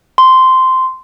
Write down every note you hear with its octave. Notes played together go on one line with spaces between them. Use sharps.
C6